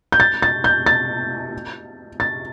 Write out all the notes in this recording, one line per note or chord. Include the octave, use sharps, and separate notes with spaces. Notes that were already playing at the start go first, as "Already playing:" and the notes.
G6
A6
A6
G6
A6
A6